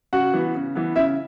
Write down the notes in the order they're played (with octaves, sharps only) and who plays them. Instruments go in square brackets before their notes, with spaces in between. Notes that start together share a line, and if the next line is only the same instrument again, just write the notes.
[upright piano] C#3 F#4 F#5
E3 B3
C#3
E3 B3
C#3 E4 E5